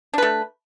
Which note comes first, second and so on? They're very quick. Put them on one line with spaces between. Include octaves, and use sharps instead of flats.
D4 B4 A3